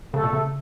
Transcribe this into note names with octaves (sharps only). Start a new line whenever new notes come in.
C#3 A3 A4
B2
C#3